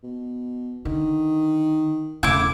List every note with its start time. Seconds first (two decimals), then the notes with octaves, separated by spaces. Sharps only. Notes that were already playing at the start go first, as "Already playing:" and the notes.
0.03 B2
0.85 D3 D#3
2.23 E1 A2 C#3 E4 D6